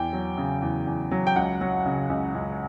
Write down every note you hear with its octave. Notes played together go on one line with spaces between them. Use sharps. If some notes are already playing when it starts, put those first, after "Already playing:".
Already playing: E2 G5
F#3
C#3
E2
E2
F#3
G5
C#2 F#5
F#3
C#3
C#2
C#2